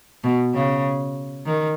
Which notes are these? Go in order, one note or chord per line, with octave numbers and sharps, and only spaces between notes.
B2
C#3
D#3